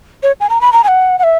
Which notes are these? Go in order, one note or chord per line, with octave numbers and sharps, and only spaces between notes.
C#5
G#5
A#5
B5
A#5
G#5
F#5
F#5
E5